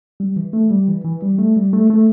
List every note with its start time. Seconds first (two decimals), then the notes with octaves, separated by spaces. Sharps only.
0.20 G3
0.36 E3
0.53 A3
0.70 G3
0.88 E3
1.04 E3
1.22 G3
1.38 A3
1.57 G3
1.73 A3
1.90 A3